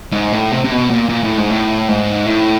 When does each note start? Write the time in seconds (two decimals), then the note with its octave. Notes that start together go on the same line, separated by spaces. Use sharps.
0.12 G#2
0.32 A2
0.52 C3
0.64 C3
0.71 B2
0.90 A#2
1.09 A#2
1.23 A2
1.37 G#2
1.50 A2
1.88 G#2
2.26 A2